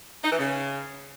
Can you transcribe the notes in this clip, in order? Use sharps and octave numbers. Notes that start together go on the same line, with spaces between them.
D#4
E3
C#3